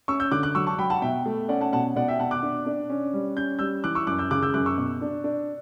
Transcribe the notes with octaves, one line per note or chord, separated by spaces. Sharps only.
C#4 C#6 E6
E6 G6
D3 D6 F#6
D6 F#6
F#3 C#6 E6
A5 C#6
F#3 G5 B5
F#5 A5
B2 E5 G5
A3
C#4 D5 F#5
F#5 A5
B2 F#5 A5
B2 D5 F#5
E5 G5
B2 F#5 A5
D6 F#6
D4
D4
C#4
G3
C#4 G6
G3 E6 G6
E3 D6 F#6
C#6 E6
F#2 D6 F#6
E6 G6
C#3 D6 F#6
E6 G6
F#2 D6 F#6
C#6 E6
B2
D4
D4